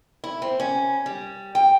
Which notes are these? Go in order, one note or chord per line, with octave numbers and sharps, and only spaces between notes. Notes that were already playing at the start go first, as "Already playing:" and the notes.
E4
C4
C#4
G3
G5